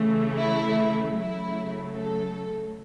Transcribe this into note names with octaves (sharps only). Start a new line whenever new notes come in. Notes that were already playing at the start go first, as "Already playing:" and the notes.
Already playing: C#3 E3 A3
E4
C#3 F#3 A3 E4
A4